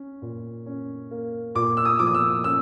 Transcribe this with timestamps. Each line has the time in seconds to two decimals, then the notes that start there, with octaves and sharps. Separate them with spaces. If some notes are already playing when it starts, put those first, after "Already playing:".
Already playing: C#4
0.22 A#2
0.66 C#4
1.11 A#3
1.55 A#2 D6
1.77 E6
1.85 D#6
1.99 F3 D6
2.07 D#6
2.15 E6
2.44 C#4 E6